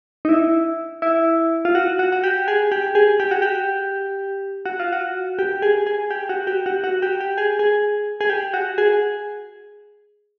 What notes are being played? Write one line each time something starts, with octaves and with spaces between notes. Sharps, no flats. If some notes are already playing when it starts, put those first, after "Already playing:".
D#4
E4
E4
F4
F#4
F#4
F#4
G4
G#4
G4
G#4
G4
F#4
G4
F#4
F4
F#4
G4
G#4
G#4
G4
F#4
G4
F#4
F#4
G4
G4
G#4
G#4
G#4
G4
F#4
G#4